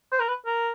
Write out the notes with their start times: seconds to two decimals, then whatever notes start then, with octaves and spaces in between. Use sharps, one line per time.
0.12 C5
0.20 A#4
0.28 B4
0.46 A#4